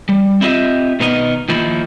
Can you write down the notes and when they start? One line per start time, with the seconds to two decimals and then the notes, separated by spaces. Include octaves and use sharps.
0.09 G3
0.41 C4 E4 F4 G4 D#5 E5
1.00 B2 D#3 B3 D#4 A#4 D#5
1.49 D#3 F3 A#3 D#4 E4